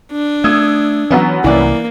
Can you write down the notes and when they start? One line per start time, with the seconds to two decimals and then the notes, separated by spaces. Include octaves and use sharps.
0.12 D4
0.44 A3 D#6 E6 G#6
1.10 E3 F#3 B3 C#4
1.44 C2 E3 A#3 D5